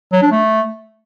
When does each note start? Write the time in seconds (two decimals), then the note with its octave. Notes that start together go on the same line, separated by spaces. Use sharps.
0.13 F#3
0.22 D4
0.32 A3